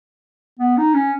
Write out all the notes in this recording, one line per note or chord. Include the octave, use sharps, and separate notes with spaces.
B3
D#4
C#4